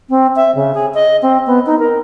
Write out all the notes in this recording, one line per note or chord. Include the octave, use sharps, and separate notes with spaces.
C4
E5
C#3
G#4
D#5
C4
B3
D#4
A#4